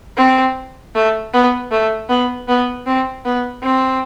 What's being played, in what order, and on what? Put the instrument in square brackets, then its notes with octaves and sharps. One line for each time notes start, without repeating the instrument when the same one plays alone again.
[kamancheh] C4
A3
B3
A3
B3
B3
C4
B3
C4